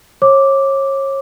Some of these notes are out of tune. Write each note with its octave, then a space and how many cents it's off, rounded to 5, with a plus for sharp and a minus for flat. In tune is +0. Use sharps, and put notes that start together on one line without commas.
C#5 -30 D6 -5